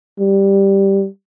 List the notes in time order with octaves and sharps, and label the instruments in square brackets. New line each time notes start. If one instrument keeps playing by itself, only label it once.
[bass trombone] G3